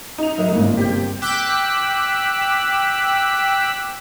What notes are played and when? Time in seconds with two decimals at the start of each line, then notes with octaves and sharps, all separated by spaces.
0.18 D#4 F7
0.38 F#3 A#4 E5
0.51 G1 G#2 C#3 A#3
0.65 D4 F4
0.77 C3 G4 G6
1.21 G5 D6 E6 F#6 B6